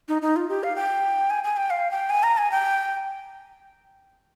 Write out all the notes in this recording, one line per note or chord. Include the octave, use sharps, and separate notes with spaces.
D#4
D#4
F4
G4
F5
G5
G#5
G#5
G5
F5
G5
G#5
A#5
G#5
G5